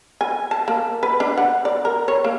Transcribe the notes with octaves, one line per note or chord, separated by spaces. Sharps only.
G#5
A5
A#3
B4
D4
F#5
D5
A#4
C#5
A#3